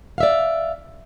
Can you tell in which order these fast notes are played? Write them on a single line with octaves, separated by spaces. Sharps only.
F5 E5 D5